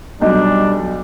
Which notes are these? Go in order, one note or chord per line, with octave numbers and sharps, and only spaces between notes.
B1 F#3 G3 D4 D#4